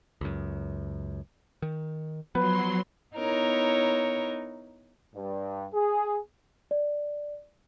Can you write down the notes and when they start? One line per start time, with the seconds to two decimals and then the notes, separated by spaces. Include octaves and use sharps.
0.21 C#2 F#2
1.62 D#3
2.35 F3 F#3 B3 B4 C6
3.15 B3 D#4 E4 A#4 C#5
5.15 G2
5.73 G#4
6.71 D5